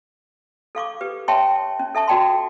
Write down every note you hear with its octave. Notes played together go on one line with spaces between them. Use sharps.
A4 F5 C#6 D6
G4 B4
C#5 E5 G5 A5 C6 C#6
C#4
A4 E5 A5 C#6
F#4 D5 G5 A5 C6